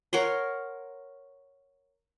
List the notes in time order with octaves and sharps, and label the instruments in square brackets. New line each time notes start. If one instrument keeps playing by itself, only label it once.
[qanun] A#4 C#5 F#5 C6